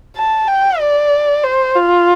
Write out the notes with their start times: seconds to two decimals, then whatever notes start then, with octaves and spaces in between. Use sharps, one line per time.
0.16 A5
0.47 G5
0.79 D5
1.44 C5
1.75 F4